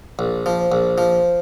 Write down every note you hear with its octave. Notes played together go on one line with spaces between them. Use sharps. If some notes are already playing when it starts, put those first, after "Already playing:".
A#1 C5
F3
C5
A#1
F3